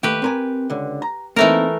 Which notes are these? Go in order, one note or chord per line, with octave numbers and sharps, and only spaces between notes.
D#2 A3 G4 B4
C4 A#4 G#5
C#2 D3
A#5
E3 A3 A#3 C4 D#4 A#4